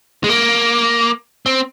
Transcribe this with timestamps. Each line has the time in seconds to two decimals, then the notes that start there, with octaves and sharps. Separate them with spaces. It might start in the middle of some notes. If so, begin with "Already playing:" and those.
0.24 G#3
0.29 A#3
1.46 C4